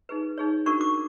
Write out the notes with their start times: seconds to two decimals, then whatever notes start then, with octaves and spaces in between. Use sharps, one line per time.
0.09 D#4 G#4 B4
0.38 D#4 G#4 C#5
0.66 D4 F#4 A#4 C#6
0.81 D6